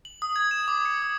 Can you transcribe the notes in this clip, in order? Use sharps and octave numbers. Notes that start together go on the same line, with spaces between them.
F#7
D#6
G#6
E7
D6
C#7
D#6